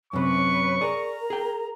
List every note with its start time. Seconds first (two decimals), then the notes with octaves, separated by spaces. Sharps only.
0.13 F#2 C3 B4 C#5 C#6
0.81 G#4 A#4 D5 A#5
1.30 G#4 G5